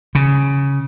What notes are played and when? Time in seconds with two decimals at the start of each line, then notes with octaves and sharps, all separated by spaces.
0.15 C#3